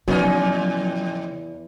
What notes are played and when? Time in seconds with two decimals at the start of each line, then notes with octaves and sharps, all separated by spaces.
0.08 E2 A2 C#3 F3 F#3 C#4 D#4